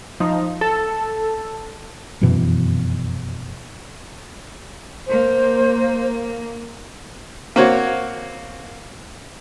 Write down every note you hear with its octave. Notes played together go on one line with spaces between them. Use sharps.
F3 D#4
A4
F1 F#2 B2 E3
A#3 C5
A#3 C4 F#4 C#5